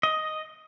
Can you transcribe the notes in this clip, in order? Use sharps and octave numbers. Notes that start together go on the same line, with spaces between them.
D#5